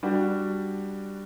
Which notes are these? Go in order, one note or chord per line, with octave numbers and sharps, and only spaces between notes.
G3 D4 F#4